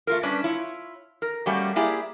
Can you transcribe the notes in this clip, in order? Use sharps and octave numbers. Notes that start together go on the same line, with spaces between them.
A3 F4 A#4
G3 C#4 D4 B4
E4 F4 C#5
A#4
G3 A3 A#3 C#4 F#4 G4
A#3 E4 G4 G#4 D5 E5